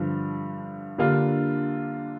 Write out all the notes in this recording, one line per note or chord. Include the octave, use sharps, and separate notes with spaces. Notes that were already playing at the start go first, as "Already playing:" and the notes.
Already playing: G2 D3 F3
D3 G3 A#3 D4 F4